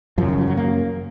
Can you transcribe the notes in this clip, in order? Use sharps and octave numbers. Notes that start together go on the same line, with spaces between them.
F#2 C#3 F3
D#3
F3
F#3
A#3